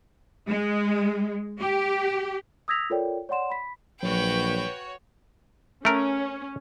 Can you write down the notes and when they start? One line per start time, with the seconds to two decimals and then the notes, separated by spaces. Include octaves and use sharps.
0.48 G#3
1.61 G4
2.68 D#6 E6 G#6 A#6 B6 F7
2.90 F4 A4 A#4 C#5 D5 G5
3.29 C#5 D5 F#5 C6 E7
3.50 B5 B6
4.03 A#1 F#3 F#4 B4 C#5 G5
5.85 A3 C#4 A#4